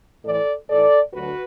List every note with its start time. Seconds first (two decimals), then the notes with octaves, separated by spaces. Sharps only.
0.23 A2 E3 A4 D5
0.69 A2 E3 A4 D5
1.13 D2 D3 F#3 F#4 B4